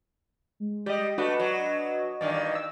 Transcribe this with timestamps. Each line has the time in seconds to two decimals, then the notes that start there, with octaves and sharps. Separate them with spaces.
0.60 G#3
0.86 G3 G4 D#5
1.18 A3 D4 F#4 B4 D#5
1.40 F#3
2.21 G2 D#3 E3 D5
2.55 E6